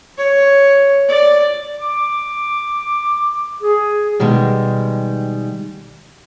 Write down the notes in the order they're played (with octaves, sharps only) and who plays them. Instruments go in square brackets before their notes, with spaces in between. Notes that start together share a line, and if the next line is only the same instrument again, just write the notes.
[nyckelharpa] C#5
D5
[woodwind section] D6
G#4
[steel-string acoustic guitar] B2 D#3 G3 G#3